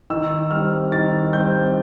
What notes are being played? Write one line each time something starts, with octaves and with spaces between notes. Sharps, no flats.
D#3 E6
G3 C4 F6
D#3 A6
G3 C4 G6